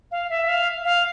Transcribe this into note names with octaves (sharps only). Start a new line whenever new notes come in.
F5
E5
F5
F5